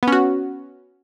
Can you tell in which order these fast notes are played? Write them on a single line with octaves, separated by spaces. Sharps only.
B3 C#4 F#4